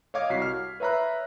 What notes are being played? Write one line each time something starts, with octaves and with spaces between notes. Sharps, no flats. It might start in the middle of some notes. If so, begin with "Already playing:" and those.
C#5 D#5 F5 D6 G#6
C2 F#4 B6 C7
F6
B4 C#5 E5 A#5 B5 F#6